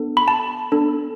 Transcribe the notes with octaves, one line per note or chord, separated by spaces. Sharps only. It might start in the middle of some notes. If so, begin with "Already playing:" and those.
Already playing: B3 D4 A4
B5
A5
B3 D4 A4